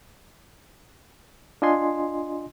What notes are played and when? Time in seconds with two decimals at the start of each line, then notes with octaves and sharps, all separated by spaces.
1.62 D4 F4 D#5 G#5 C6